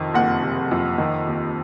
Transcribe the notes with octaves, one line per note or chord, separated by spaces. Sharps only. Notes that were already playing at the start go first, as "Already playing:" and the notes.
Already playing: F2 C3 D#3
F#1 F#5
C3
F2
D#3
D#2